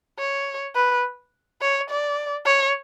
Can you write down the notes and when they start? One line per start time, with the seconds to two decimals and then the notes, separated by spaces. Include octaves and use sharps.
0.19 C#5
0.76 B4
1.61 C#5
1.90 D5
2.46 C#5